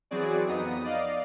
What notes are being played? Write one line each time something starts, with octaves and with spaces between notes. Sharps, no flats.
E3 F#3 C4 F#4 G#4 D5
F2 B3 D#4 D#6
D5 D#5 F5